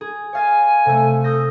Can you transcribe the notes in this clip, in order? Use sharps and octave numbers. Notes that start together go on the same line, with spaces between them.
G#4
C#5 F5 G#5 A6
C3 A3 A4
A4 D#6 G6 A#6